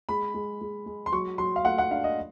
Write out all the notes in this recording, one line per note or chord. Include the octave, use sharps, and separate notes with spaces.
G#3 B5
G#3
G#3
G#3
C6
F#3 C#6
F#3 C6
F5
A3 F#5
F#5
D4 F5
D#5